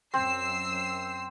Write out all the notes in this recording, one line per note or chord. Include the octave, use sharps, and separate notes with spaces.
F#2 C4 E6 C7